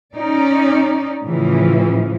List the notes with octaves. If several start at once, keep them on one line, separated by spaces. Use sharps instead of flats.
C#4 D#4 D5
A2 C#3 E3 F3